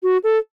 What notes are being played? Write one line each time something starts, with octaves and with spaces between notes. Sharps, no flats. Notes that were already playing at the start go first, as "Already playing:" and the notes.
F#4
A4